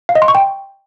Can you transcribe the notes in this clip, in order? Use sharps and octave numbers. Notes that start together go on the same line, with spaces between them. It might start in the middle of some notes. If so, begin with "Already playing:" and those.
F5
D#5
C6
C#6
G5